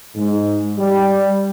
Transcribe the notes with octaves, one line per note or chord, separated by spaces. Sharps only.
G#2
G3